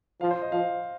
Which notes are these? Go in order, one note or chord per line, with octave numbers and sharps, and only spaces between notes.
F3 F5
C5
D#5
F3 F5